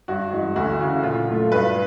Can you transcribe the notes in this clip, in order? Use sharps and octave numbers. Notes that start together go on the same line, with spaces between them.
G2 F#4
E3 G#3
D2 F#4
C#3 E3
A#2 F4
F#3 A3
G2 B4